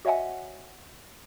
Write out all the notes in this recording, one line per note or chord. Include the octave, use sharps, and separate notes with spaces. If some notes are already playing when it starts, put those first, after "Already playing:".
F#4 C#5 D#5 E5 F#5 G#5